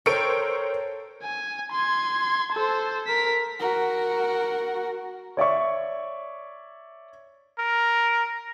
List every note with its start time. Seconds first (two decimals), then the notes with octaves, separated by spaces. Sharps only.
0.06 A4 A#4 C5 C#5 G5 C#6 C#7 D7
1.23 G#5
1.72 C6 G#6
2.52 A4 C5
3.07 A#4 B6
3.60 F#4 A#4
5.37 C#5 D5 E5 C#6
7.59 A#4